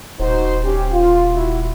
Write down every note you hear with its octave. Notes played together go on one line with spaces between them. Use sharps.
D#1 D#4 F#4 C5
C#4 G4
F4
E4 F#4